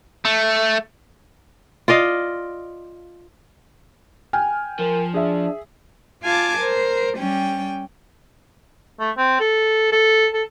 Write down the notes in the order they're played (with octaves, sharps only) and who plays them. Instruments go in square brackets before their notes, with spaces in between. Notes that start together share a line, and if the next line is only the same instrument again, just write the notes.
[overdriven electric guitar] A3
[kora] F4 D5 D#5 F5
[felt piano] G5 G#5 F6
[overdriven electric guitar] F3 [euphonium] A#4
[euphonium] D4 [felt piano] G#4 E5
[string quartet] F4 F5 G#5 A5 D6
A#4 C5
G3 C#4 G5
[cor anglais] A3
C4
A4
A4
A4